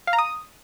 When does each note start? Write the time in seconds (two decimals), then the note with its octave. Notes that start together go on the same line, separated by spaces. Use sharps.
0.07 F5
0.13 A#5
0.19 D#6